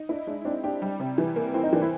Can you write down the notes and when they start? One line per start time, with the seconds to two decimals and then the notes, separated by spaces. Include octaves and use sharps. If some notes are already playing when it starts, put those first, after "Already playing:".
Already playing: D#4
0.09 D4 E4
0.27 G#3 D4
0.45 C4 D4
0.64 D4 G4
0.82 G3
1.00 C3
1.18 E3
1.36 A#3
1.54 C4 E4
1.63 D#4
1.73 E3 D4
1.82 E4